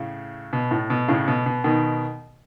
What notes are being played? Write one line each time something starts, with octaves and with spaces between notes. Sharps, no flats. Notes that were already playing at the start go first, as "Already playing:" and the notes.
Already playing: A2 C#3
B2
A2
B2
A2 C#3
B2
B2
B2 D#3